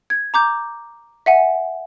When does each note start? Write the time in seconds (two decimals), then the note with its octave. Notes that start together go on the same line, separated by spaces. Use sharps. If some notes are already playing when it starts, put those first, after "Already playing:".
0.10 G#6
0.34 A#5 D6 G6
1.26 E5 F#5 G#5